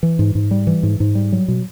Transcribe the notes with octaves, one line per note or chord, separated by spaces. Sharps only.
E3
G#2
G#2
G3
E3
G#2
G#2
G3
F#3
B2